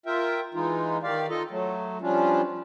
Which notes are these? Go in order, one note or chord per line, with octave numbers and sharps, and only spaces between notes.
F4 A#4 E5 G5
E3 G#3 D#4 F4
D#3 G4 D5 F5
D#4 F4 A4 D#5
F#3 A3
F3 G3 C#4 D4 F4